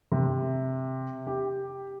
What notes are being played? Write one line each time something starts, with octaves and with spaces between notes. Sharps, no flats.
C3
G4